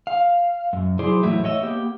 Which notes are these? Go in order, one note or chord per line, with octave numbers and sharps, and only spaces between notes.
F5
F#2
F#3 E4 G#4 C5 D5
E2 A2 F#3 A3 F#4 E5
C#5 D#5 E5
A#3 B3 G4